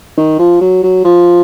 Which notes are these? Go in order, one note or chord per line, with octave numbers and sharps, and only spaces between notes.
D#3
F3
F#3
F#3
F3